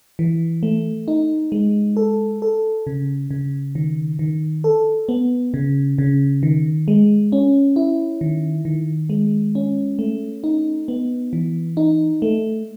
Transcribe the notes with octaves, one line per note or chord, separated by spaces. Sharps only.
E3
A3
D#4
G#3
A4
A4
C#3
C#3
D#3
D#3
A4
B3
C#3
C#3
D#3
G#3
C#4
E4
D#3
D#3
G#3
C#4
A3
D#4
B3
E3
D#4
A3